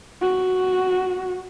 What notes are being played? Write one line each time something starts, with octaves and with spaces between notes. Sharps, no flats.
F#4